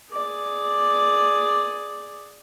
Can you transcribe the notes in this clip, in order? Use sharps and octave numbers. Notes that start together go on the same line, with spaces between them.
G#4 D5